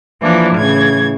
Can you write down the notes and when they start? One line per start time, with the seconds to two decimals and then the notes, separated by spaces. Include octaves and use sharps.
0.21 E3 F3 A#3 D4 E4 F4
0.55 A2 C#3 E3 G#6